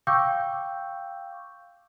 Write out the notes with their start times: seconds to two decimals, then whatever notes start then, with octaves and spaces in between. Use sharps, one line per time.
0.07 F5 G5 C#6 D6 E6 G6